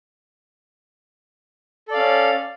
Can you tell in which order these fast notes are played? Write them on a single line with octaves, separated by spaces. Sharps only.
A4 D5 F5 C#4